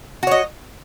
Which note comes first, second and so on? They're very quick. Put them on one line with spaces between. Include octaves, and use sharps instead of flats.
F#4 C#5 D#5